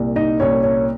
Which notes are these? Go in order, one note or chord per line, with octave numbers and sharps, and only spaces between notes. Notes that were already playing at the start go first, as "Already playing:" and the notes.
Already playing: C2 A#2
D#4 D#5
C2 A#2 C#4 C#5
C#4 C#5